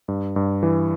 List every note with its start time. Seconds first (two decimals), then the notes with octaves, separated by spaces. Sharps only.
0.08 G2
0.36 G2
0.63 E3